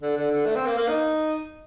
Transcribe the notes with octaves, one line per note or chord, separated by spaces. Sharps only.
D3
D3
D3
A3
C4
A#3
A#3
D#4